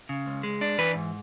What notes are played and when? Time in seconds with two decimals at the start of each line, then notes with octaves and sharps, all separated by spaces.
0.09 C#3
0.26 C#2
0.43 G#3
0.61 D4
0.78 E3 B4
0.95 G#2